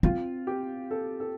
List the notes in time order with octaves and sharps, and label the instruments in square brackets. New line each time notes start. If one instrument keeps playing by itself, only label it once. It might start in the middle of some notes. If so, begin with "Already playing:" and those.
[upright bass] C4 [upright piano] F4
[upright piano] G4
A4
A4